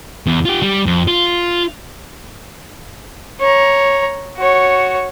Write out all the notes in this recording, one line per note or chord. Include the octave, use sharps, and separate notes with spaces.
E2
F4 G4
G3
F2
F4
C#5 A#5
F#4 C#5